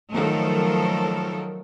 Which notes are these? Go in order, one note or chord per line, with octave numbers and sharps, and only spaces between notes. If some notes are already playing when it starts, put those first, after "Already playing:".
D#3 F3 F#3 A3 A4 A#4